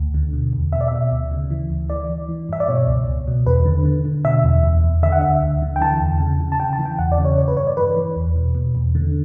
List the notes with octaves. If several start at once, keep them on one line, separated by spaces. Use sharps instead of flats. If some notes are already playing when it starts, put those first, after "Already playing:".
Already playing: D2
D3
B2
E2
B2 E5
D5
B2 E5
D2
C#3
E3
D2
E3 D5
E3
E3
G2 E5
D5
B2 C#5
C#2
C#2
B2
E2 B4
D3
D3
D3
B2 E5
E2
E2
E2
D3 E5
F#5
D2 E5
D2
D3
G5
E3 A5
E2
C#3
C#3
A5
C#3 G5
A5
E3
G5
E2 F#5
D5
C#3
C#5
G2 C#5
B4
G2 C#5
D5
E3 B4
E3
E2
B2
B2
E2
D3